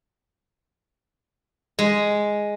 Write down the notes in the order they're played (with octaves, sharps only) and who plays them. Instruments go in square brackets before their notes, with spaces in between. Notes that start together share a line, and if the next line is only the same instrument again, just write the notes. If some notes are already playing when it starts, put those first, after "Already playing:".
[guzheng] G#3